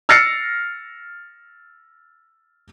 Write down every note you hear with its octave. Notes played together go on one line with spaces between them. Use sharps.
E6 F6 A6 A#6 C7 C#7